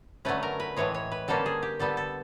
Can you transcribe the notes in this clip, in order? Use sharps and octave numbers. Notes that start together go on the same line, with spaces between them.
D3 F#3 A3 C#4 B4
A#4
B4
A2 E3 G#3 C#5
C#5
B4
D3 G3 A#3 C#4 A4
G#4
G4
D3 G3 B3 A4
A4